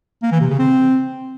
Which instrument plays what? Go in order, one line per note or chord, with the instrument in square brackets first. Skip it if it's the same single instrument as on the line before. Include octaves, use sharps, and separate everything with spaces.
[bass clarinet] A#3
E3
C3
C#3
C4